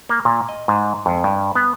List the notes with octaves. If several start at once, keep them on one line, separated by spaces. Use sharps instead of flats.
A#3
A#2
D#5
G#2
F2
G2
B3